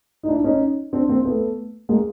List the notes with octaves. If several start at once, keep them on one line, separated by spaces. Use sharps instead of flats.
D#4
D4 E4
C#4 D#4
C4 D4
A#3 C4
A3 B3
G#3 A#3